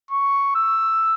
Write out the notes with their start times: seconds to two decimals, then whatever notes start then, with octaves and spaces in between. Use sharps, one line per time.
0.11 C#6
0.55 E6